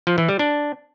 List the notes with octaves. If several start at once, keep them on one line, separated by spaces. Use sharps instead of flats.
F3
E3
G3
D4